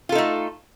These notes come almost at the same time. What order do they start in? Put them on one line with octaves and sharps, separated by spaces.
F4 A4 D#4 A3